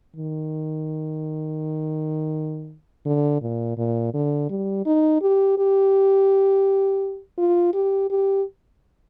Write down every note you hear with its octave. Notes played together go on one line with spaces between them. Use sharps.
D#3
D3
A#2
A#2
D3
G3
D#4
G4
G4
F4
G4
G4